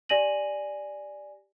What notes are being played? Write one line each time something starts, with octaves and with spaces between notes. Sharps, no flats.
G4 D5 G#5 A#6 D#7 F#7